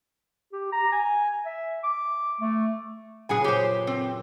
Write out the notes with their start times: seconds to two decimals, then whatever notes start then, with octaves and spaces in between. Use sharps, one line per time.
0.53 G4
0.72 A#5
0.92 G#5
1.46 E5
1.84 D6
2.41 A3
3.29 F#1 A#2 G#4 B4 F#5 G#5
3.44 G4 C5
3.87 C4